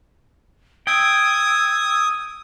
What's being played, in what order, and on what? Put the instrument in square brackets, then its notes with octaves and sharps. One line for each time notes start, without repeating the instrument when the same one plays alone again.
[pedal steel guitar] G5 [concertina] D#6 [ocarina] E6 [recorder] G#6